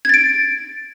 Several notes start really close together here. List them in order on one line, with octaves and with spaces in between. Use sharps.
G#6 A6 D7